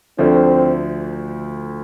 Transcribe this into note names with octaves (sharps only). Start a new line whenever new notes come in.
D2 D3 F3 A3 C4